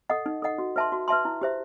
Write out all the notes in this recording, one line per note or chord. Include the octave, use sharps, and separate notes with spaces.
A4 D#5 F#5
D#4
A4 D#5 F#5
F#4
B4 E5 A5 C6
F#4
B4 E5 A5 C6
E4
G4 C5 E5